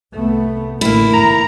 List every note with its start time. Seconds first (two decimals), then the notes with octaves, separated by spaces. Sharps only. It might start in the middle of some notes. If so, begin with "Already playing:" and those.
0.13 C2 A3 B3
0.81 A1 D3 A3 A#3 E4
1.13 E2 G#2 A#5